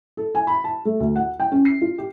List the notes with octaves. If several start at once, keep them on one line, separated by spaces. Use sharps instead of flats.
A4
G#5
B5
A5
A3
D2
F#5
G5
C#4
C7
F4
G4